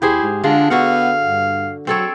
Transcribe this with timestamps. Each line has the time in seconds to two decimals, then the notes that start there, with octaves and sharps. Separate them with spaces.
0.02 D#2 E4 G4 G#4 C5
0.22 G#2
0.44 D3 G#3 D4 F4
0.70 D3 B3 F#4 F5 F#5
1.24 G2
1.87 F#3 C4 F#4 A4 C#5